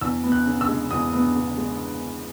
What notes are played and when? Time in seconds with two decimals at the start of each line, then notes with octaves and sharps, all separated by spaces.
0.01 E2 E6
0.23 B3
0.32 F#6
0.46 C#3
0.61 E6
0.68 G#3
0.91 E2 D#6
1.13 B3
1.35 C#3
1.57 G#3